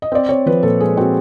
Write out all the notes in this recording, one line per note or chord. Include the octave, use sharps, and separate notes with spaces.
D#5
C4 D5
C4 C#5
F3 B4
A#2 A4
G#3 G#4
C4 F#4